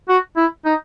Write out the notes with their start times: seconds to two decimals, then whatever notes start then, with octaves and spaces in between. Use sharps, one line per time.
0.09 F#4
0.37 E4
0.65 D#4